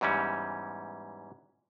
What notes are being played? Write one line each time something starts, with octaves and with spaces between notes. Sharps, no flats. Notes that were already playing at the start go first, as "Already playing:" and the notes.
E2 G#2 E3 G3 C#4